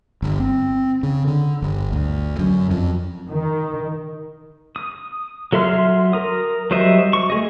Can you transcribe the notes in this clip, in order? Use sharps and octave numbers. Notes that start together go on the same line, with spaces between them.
G1
C4
C#3
D3
G1
D2
F#2
F2
D#3
D#6
F#3 A4 E5 C6 F6
A#4 D#6
F#3 G3 C5 D#5 E5
C#6
A3 G#4 D#5